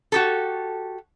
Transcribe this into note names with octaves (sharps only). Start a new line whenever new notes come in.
F#4 G4 A4